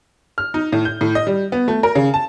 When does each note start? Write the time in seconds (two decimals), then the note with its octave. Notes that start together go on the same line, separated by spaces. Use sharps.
0.38 F6
0.54 D#4
0.72 A2
0.85 G6
1.01 A2
1.15 D#5
1.27 G3
1.52 B3
1.68 A3
1.83 A#4
1.95 C#3
2.14 A5